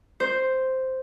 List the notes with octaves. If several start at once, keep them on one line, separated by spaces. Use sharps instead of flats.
C5